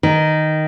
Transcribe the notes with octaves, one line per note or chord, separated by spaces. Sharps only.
D#3